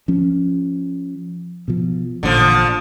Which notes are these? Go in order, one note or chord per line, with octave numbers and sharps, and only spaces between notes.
F3 C#4
B2 F3
A1 A#2 D3 F3